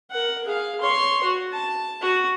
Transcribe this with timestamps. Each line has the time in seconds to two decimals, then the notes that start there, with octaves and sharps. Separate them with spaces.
0.11 A#4 F#5
0.44 G#4 F5
0.81 C#5 C6
1.23 F#4
1.52 A5
2.02 F#4